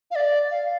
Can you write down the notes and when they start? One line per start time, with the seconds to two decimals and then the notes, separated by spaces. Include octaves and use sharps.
0.11 F5
0.15 D5
0.51 F5